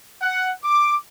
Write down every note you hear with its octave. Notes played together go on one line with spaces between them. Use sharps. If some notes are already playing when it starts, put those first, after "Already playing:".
F#5
D6